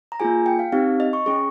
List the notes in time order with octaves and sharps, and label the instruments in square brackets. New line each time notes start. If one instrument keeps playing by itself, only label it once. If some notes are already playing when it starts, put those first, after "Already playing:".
[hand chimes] A#5
A#3 F4 G#4 G#5
G5
F5
C4 D#4 G4 F5
D#5
C#6
C#4 G#4 C#6